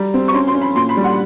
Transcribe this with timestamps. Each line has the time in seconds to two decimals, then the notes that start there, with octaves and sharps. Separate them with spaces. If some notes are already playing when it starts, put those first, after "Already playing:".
Already playing: G3 A#5
0.14 C4
0.28 C#6
0.34 C#4 C6
0.48 C6
0.54 C#4
0.62 B5
0.76 A#2 C6
0.89 B5
0.97 G3
1.04 F#5